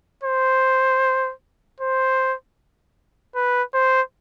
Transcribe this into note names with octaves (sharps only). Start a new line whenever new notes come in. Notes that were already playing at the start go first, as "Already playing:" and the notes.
C5
C5
B4
C5